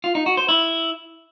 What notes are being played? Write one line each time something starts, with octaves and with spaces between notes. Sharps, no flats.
F4
D#4
F#4
C5
E4